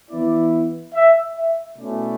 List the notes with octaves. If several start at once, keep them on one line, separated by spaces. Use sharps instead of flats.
E3 B3 E4 D5
E5
E5
B2 A3 C#4 E4 D5